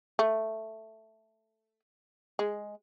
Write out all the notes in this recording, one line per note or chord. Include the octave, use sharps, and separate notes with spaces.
A3
G#3